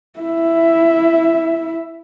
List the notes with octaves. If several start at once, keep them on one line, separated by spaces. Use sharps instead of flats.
E4 E5